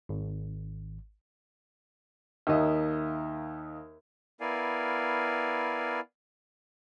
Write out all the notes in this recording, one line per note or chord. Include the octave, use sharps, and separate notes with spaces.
G#1
D#2 A#3 D#4 D#5 E5
B3 E4 A#4 D5 F5 G#5